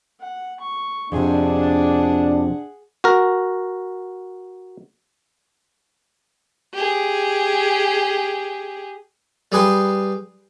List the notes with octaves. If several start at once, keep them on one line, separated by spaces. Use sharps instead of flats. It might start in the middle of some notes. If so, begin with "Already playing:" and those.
F#5
C#6
F2 C3 D4 G#4 F#5
F#4 A#4
G4 G#4
G3 G#4 B4 G5 C6